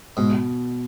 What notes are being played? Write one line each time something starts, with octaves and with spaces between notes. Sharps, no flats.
G#2 B2